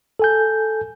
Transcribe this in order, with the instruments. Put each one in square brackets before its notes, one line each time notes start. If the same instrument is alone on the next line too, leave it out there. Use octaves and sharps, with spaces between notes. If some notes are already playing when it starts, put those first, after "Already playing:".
[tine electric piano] A4 G#5 G6